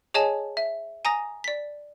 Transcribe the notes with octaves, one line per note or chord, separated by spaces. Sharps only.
G#4 C#5 D#5 G#5 A5
E5
G#5 A#5 D#6 A#6
D5 B6